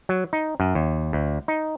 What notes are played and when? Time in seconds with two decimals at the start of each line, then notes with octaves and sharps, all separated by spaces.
0.09 F#3
0.33 D#4
0.60 F#2
0.75 D#2
1.13 D2
1.48 D#4